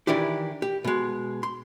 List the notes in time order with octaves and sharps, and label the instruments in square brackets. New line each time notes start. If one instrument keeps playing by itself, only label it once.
[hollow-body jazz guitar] D#3 E3 D4 E4 G4
G4
B2 G#3
C6